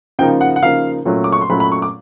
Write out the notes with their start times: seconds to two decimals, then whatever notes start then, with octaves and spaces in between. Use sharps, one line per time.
0.19 C#3 F3 A#3 D#4 G5
0.41 F#5
0.56 F#5
0.62 C#3 F3 A#3 D#4 F5
1.05 A#2 F#3 A3 C#4
1.24 D6
1.32 C#6
1.41 C6
1.49 A#2 F#3 A3 C#4 B5
1.60 B5
1.72 C#6
1.82 D6